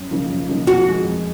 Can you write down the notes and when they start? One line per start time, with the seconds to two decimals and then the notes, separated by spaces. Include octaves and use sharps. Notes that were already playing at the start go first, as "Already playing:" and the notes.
Already playing: F#2
0.11 C#3 F3 A#3 D#4
0.30 F#2
0.48 C#3 F3 A#3 D#4
0.67 F2 F#4
0.86 D#3 G#3
1.04 F2